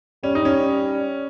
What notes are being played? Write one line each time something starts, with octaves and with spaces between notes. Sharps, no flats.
G3 C#4
D#4
C#4